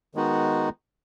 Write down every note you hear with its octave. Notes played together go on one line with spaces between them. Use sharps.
D#3 G#3 B3 D#4 F#4